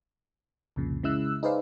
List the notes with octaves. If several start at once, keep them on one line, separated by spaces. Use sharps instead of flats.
C2 F2 A#2 C#3
C#3 G#3 E4 E6 F#6
D#4 G#4 B4 C5 D5 F5